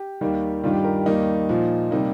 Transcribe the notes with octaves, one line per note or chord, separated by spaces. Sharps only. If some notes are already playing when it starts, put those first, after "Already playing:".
Already playing: G4
D#2 D#3 G3 A#3
G2 D#3 G3 F4
G4
A#4
G4
D#2 D#3 G3 A#3 D#4
A#2 F3 A#3
C3 G3 A#3 D#4